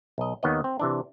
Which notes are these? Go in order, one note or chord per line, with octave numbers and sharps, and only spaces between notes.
B1 D#5
D#2 D#3 B3 C#5 D#5
C4
C3 E3 D4